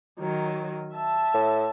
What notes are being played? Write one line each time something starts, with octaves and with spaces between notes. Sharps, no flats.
D#3 F#3
E5 A5
A2